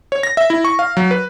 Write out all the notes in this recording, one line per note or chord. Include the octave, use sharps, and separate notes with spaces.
C#5
A#6
E5
E4
C#6
F5
F#3
B4